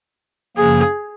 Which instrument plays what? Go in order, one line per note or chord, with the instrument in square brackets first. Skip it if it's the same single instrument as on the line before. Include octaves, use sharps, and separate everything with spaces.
[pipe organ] F#2 C#3 F3 A#3 [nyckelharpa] G#4